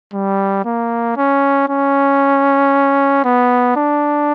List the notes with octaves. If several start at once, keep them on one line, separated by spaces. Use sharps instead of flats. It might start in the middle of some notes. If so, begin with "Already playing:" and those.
G3
A#3
C#4
C#4
B3
D4